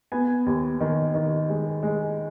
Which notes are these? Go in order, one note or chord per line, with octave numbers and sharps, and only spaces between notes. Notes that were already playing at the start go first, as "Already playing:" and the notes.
B3 G#5
D#2
D#3
D#3
G#3
G#3